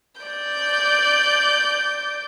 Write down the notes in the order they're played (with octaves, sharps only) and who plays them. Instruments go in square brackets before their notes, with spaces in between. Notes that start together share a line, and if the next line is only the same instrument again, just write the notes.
[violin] D5 G6